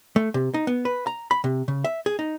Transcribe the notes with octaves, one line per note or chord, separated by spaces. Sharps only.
A3
C3
D#4
B3
B4
A#5
B5
C3
C#3
E5
G#4
D#4